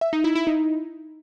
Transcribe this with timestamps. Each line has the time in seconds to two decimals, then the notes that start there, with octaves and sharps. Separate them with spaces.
0.01 E5
0.13 D#4
0.24 E4
0.35 E4
0.47 D#4